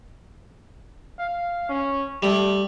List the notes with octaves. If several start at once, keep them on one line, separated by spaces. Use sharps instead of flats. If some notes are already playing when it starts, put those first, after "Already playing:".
F5
C#4
G3 A3